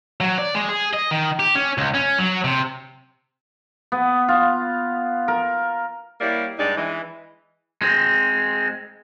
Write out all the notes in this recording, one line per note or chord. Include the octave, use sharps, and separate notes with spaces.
F#3
D5
G#3
G#4
D#5
D#3
G4
C#4
C#2
C#4
F#3
C3
B3
F4
A#4
G3 A#3 E4 C#5 D5
G2 G#3 D#4 D5
E3 G#3
G#3 C4